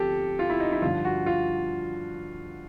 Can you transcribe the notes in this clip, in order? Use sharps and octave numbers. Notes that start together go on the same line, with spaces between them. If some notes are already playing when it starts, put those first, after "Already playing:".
Already playing: D2 C3 F3 G4 A4
F4
E4
D#4
E4
G2 D3 F3 F4
F#4
F4